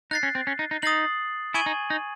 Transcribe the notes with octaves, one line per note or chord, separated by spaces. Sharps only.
D#4 F#6 A6 C7
C#4
C4
C#4
D#4
D#4
D#4 D#6 A6 C7 F#7
E4 G#5 C#6 G#6 D#7 F#7
D#4
D#4